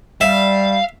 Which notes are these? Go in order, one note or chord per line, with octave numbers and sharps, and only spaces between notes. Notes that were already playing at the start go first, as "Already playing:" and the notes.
G3 E5 F5